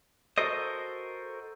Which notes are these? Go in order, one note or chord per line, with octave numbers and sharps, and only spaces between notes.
F#4 A4 A#4 C5 D#5